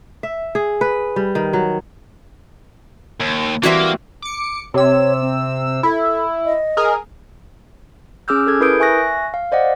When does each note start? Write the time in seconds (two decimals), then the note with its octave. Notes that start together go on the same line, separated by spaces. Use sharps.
0.23 E5
0.55 G#4
0.81 B4
1.16 G3
1.35 D#3
1.53 F#3
3.21 D#2
3.63 E3 G3 A#3 C4 F#4 E5
4.22 D6 C#7
4.74 C3 C#5 E6
5.21 C4
5.83 E4 A4
6.45 D#5
6.77 G#4 A#4
8.28 C#4 G#4 D6 E6 F6 G6
8.47 G#4 A4 G#6
8.60 E4 A#4 B4 D#6 G6 D7
8.80 E5 G#5 C#6 F#6 A#6
9.34 F5
9.52 C5 D5 D#5 F#5